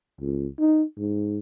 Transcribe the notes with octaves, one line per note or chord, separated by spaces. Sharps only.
C#2
D#4
G#2